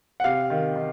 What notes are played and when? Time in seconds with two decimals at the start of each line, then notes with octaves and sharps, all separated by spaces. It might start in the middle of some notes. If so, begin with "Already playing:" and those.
0.20 F#5
0.24 C3 F5
0.50 D#3
0.76 D#3